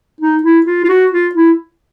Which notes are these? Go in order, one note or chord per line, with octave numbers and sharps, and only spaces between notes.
D#4
E4
F4
F4
F#4
F4
E4